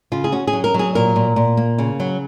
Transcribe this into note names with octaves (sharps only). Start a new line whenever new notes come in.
C#3 F4
G#4
C#4 F#4
G#4
F#3
A#4
F#3
G#4
A#2 A#4
A#2
A#2
A#3
C#3
F#3